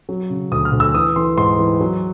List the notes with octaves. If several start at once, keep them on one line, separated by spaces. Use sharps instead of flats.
F#3
C#3
D2 D#6
F6
D2
E6
E3 D#6
E3 C6
G#2 C6
E3
F#3